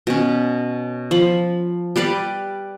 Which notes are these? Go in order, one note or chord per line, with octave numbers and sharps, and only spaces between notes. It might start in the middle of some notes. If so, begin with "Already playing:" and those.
B2 C#4
F3 B5
G3 G4 B4 D5